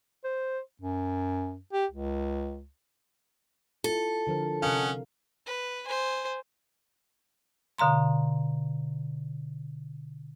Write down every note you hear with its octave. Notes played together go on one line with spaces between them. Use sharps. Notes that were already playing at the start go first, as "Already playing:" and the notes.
C5
F#2
G4
C#2
E4 F4 A4
D3 F3 A#4
C3 C#4 A#4 D#5 F5 F#5
B4
C5 G#5
B2 D3 F5 A#5 C6